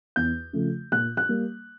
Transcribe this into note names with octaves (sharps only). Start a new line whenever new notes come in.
E2 G6
C#3 F3 A3
A#2 F#6
F#6
G3 A#3